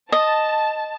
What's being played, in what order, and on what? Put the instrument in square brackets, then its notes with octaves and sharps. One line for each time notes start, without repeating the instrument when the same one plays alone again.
[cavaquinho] D#5 [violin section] A5